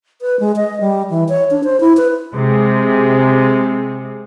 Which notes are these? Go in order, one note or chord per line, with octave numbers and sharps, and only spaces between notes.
B4
G#3
D#5
G3
E3
C#5
D4
C5
E4
B4
C3 G#3